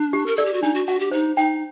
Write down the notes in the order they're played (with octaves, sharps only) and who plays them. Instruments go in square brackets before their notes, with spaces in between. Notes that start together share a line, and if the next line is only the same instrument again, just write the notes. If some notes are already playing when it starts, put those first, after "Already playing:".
Already playing: [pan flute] D4
[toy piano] G4
[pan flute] A#4
[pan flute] A4 [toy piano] D5
[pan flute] G4
F#4
[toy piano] D4 [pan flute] D#4
[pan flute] F#4
[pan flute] F#4 [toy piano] F#5
[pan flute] G4
[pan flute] D#4 [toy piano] C5
[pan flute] D#4 [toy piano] G5